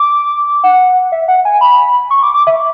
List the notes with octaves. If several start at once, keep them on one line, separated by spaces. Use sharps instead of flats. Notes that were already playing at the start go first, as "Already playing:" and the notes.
Already playing: D6
F#5
E5
F#5
G#5
B5
C#6
D6
D6
E5